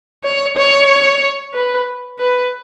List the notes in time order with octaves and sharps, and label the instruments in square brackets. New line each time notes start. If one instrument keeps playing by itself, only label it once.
[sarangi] C#5
C#5
B4
B4